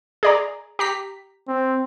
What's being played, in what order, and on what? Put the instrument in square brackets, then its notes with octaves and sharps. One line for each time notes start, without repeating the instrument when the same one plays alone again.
[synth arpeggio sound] G#4 D5 A#5
G4 A#5 B6
[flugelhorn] C4